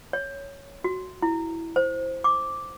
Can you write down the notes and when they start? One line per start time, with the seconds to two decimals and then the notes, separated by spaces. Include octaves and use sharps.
0.13 C#5
0.84 F#4
1.22 E4
1.76 C5
2.24 D6